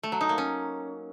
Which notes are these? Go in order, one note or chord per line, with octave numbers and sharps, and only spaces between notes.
A3
F#3
D#4
A#3
C#4